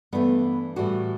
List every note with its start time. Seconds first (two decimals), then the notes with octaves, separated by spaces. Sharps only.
0.12 G2 E3 A3 B3
0.76 A2 E3 G3 F#4